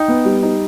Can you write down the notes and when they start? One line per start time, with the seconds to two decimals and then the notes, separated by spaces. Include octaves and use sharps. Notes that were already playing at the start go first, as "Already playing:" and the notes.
Already playing: D#4 G5
0.08 B3
0.25 G3
0.43 D#4